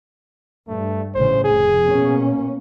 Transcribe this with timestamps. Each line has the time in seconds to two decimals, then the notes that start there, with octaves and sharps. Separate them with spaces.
0.68 G2 A3
1.15 A1 A2 C#3 C5
1.44 F1 G#4
1.83 B2 A#3 C#4